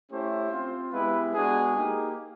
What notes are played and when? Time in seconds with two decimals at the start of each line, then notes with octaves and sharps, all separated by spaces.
0.10 A3 C#4 E4 G4 C5
0.51 C4 F4
0.93 G#3 B3 E4 G4 B4
1.34 G#3 B3 D4 F#4 G#4
1.75 A#3 D#4 G4